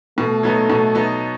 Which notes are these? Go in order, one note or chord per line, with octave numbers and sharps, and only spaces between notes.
B2 A3
F#3 B3 D#4
B2
F#3 B3 D#4